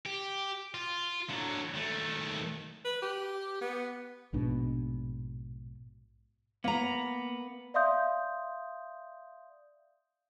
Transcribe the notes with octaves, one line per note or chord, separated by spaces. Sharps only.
G4
F4
D3 F#3
D#3 A3
B4
G4
B3
A#1 G#2 B2 D4
A#3 B3 A#5
D5 E5 F5 C6 D#6 G6